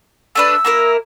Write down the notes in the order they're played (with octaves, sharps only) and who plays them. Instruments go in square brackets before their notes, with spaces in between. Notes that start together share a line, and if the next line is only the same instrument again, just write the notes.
[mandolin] A3 D4 B4 [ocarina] E6
[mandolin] A#3 E4 A#4